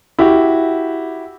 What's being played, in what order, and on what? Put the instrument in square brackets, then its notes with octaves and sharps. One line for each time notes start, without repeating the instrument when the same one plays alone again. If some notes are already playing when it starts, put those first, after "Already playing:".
[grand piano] E4 F#4 G4